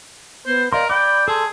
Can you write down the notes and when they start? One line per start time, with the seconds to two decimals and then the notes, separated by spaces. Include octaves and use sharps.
0.47 B3 C5
0.73 A#4 D5 D#5 F5 C6
0.90 D5 G5 B5 D6
1.28 G#4 A4 A5 C6